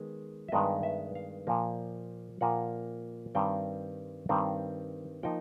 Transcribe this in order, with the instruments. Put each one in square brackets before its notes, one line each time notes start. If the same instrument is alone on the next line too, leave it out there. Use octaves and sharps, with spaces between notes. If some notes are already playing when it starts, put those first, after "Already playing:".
Already playing: [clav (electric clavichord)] D#3 G#3 B3
E5
G2 D#3 G#3 B3 D#5
E5
F5
A#2 F3 A#3
A#2 F3 A#3 F#5
G2 D#3 G3 C4 G5
G2 D#3 G3 C4
F3 A#3 D#4 G5